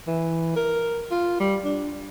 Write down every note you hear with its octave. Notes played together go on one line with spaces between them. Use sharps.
E3
A#4
F4
G3
D4